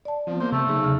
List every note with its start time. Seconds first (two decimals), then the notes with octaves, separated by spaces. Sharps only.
0.05 D5 A5
0.27 F3 B3 C4
0.40 A#3 C5 G6
0.52 C3 A3
0.67 C#3 F#3 D#4 G#4
0.84 E2 C3 F6